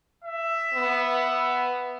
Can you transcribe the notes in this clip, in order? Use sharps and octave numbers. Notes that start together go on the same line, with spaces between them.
E5
B3